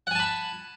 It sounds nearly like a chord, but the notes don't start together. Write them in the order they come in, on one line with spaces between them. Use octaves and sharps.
F#5 G#5 A5 B5